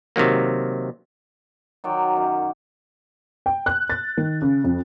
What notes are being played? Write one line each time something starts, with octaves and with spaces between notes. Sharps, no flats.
C3 D#3 F#3 A#3
D#3 F#3 D5 G5
F#2
G5
F#6
A6
D#3
C#3
F2